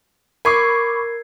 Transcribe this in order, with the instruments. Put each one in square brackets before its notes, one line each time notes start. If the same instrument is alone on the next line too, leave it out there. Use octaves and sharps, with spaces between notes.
[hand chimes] A#4 G#6 C7 [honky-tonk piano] B5 C#6 D6